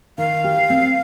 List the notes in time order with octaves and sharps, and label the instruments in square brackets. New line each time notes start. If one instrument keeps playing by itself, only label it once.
[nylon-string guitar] D#3 [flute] F5
[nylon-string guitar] G4
C4